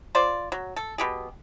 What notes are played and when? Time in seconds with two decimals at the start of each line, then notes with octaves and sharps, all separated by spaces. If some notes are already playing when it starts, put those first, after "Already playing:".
0.15 F4 C5 D5
0.52 F#3
0.76 A4
0.98 B2 G4 G#4